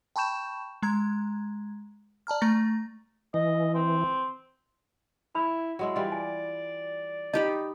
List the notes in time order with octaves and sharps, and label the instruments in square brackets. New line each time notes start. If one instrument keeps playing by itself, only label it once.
[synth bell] G5 A5 B5 C#6 G6 E7
G#3 A#5 G#6
D5 A5 A#5 F6
A3 A#5 A6 A#6
[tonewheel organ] E3 [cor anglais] D#5
[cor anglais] C4
[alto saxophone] E4 [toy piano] B5
[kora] F#3 G#3 E4
[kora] E3 G3 F4 [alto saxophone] D5
[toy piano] G#5
[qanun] D#4 G4 B5 [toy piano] D#5